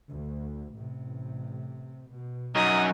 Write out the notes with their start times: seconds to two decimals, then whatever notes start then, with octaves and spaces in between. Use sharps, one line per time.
0.11 D2
0.77 A1 C3
2.12 B2
2.56 F#2 F#3 D#4 D#6